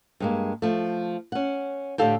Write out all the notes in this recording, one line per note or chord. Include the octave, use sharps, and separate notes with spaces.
G2 G#3 A#3
F3 A3
C#4 F#5
A2 D3 G4 A4 F5 G5